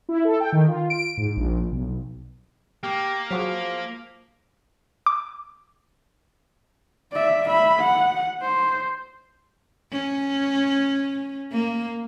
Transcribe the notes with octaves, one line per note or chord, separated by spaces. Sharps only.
E4
A4
G5
D#3
F4
D7
G#2
A#1
B1
A#3 G4 D6 F6
F3 F#3 F#4 G#4 B6 D7 F7
D6
D5 E5
E5 B5
F#5
C5
C#4
A#3